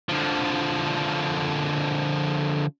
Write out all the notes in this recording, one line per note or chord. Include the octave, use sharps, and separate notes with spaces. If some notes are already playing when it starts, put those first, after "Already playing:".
D3 F3